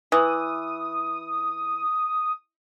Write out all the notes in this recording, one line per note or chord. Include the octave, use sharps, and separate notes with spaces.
E3 D#6